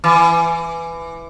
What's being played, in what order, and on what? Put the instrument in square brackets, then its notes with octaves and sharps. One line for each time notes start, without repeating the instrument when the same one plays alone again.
[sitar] E3